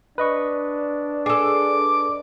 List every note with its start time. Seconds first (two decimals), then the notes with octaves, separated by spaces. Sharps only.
0.18 D4 B4 D#5 C#6
1.26 G#4 A4 D6